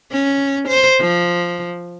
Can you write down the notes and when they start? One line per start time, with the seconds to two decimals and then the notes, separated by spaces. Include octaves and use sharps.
0.11 C#4
0.68 C5
1.00 F3